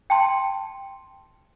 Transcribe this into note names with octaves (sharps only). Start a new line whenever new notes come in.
G5 A5 C6